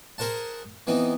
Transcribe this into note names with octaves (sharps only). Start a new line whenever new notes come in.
G#4 A#4 C5 F#5 A5
E3 B3 C4 D#4